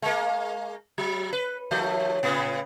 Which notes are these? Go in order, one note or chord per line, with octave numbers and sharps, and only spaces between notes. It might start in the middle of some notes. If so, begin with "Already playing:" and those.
G#3 A#3
F#3
B4
D#2 F3 A3
A2 C#3 B3